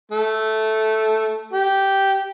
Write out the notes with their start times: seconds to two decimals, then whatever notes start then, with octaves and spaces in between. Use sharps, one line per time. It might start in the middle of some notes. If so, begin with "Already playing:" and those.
0.12 A3
1.53 G4